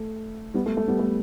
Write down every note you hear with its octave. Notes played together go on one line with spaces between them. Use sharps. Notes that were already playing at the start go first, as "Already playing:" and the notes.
Already playing: A3
G3 B3
A3
A3
G3 B3
A3